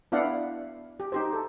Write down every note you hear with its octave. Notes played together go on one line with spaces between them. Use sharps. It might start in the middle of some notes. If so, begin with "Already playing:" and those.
B3 D4 E4 D5 F5 F#5
G4
D#4 G4 C5
A4